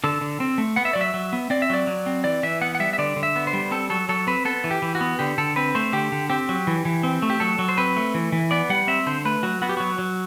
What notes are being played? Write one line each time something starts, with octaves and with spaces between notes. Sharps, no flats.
D3 A4
D3
C4
A3
B3 F#5
E5
F#3 D5
E5
F#3
B3
C4 D5
E5
F#3 D5
F#3
C4
E3 D5
E3 E5
B3 F#5
F#5
G3 E5
E5
D3 D5
D3
E5
B3
C5
G3
C4 A4
F#3 A4
F#3 A4
C4 B4
B3 A4
E3
G4
E3
F#4
B3
D3 G4
D3 A4
C4 B4
A3 C5
D3 G4
D3
C4 G4
F#3
E3
E3
C4
A3
G4
F#3 A4
F#3
C5
C4 B4
A3
E3
E3
B3 D5
G3 F#5
C4 E5
D3 C5
A3 B4
F#3 F#4
B3 F#4
G4
F#3 F#4
F#3